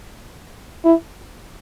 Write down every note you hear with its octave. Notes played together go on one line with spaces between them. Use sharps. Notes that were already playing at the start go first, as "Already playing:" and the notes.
E4